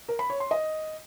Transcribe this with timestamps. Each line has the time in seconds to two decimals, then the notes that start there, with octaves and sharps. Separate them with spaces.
0.08 A#4
0.19 B5
0.30 C#5
0.40 C6
0.51 D#5